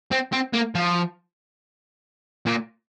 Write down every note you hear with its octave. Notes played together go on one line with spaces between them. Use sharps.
C4
C4
A#3
F3
A#2